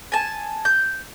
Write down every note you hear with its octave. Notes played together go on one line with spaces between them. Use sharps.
G#5 A5
G6